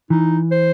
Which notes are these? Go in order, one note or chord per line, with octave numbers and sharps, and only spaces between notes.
E3 D#4
C5